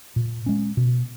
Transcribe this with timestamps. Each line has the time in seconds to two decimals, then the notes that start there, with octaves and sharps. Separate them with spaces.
0.16 A#2
0.46 G#3 C#4
0.77 B2